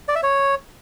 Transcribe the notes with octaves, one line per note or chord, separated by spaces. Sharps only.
D5
E5
C#5